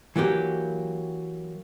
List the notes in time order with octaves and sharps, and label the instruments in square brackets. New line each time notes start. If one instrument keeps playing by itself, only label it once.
[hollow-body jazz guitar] E3 F#3 A#3 G4